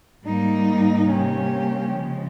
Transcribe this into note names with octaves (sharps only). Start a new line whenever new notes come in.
G#2 G3 A#3 D#4
C3 G3 A#3 C#4 G4
C#3 F3 G#3